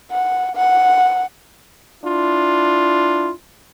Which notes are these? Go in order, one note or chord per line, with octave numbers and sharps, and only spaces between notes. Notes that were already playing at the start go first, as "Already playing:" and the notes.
F#5
F#5
D4 E4 F4